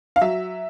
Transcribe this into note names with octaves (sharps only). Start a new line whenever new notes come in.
F5
F#3 E5